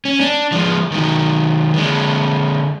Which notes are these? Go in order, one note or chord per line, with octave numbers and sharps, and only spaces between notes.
C#4
D4
F3 G#3
D#3 F#3
D3 G#3